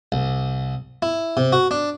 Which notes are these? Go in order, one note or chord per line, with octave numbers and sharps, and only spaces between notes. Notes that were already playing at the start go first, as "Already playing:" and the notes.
C2
E4
C3
F#4
D4